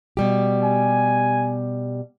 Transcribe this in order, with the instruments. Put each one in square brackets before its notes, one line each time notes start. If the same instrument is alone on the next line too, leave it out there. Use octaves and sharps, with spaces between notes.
[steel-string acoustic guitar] B2 G3 G4
[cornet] G#5